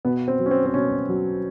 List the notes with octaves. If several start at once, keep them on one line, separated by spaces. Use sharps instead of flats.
B2 B3
C4
F#3
C#4
C4
C4
B2 C#4
F#3